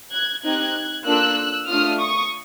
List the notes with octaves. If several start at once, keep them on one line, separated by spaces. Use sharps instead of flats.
F#6 G#6
C4 D#4 G4 F#6 G#6
A#3 D4 F4 A4 E6 F#6
A3 D4 F4 D#6 F6
C#6 D#6